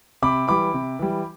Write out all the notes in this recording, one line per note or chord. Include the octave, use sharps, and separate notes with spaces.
C3 B5 D6
E3 G3 B5 D6
C3
E3 G3